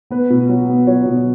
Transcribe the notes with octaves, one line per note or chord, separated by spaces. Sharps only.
B3 B4
B2
F#3
B3
F#3 C#5
B2